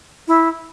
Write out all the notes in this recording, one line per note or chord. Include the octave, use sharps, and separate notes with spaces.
E4